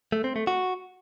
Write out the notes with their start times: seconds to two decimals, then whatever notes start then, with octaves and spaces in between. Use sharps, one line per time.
0.12 A3
0.24 C4
0.36 A3
0.47 F#4